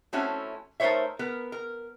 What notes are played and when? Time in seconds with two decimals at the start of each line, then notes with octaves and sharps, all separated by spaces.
0.13 A3 C4 C#4 E4 F#4
0.80 A3 D#4 A#4 C5 C#5 E5
1.19 B3 A#4 B4
1.52 A#4